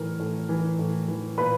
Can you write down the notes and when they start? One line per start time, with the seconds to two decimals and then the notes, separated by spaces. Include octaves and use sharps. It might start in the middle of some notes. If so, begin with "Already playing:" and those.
Already playing: A2 E3 A#4
0.19 A2
0.49 E3
0.79 A2
1.08 E3
1.38 A#2 B4 B5